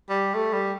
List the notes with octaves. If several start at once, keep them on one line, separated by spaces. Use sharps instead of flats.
G3
A3
G3